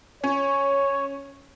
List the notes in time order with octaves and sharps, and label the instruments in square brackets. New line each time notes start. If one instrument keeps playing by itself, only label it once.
[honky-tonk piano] C#4 [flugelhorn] C#5